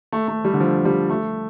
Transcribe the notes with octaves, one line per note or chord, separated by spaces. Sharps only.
A3
A3
G3
D3
F3
G3
A3